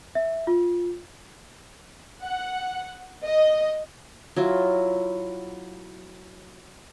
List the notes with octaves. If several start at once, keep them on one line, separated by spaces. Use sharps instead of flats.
E5
F4
F#5
D#5
F#3 E4 F4